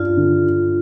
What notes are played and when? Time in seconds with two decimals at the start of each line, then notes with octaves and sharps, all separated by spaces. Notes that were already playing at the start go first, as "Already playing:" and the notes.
Already playing: G2 D4 F4
0.17 D3